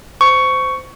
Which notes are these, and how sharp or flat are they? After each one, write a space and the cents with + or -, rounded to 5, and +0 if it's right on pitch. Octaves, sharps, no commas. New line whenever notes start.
C5 -20 C#6 +10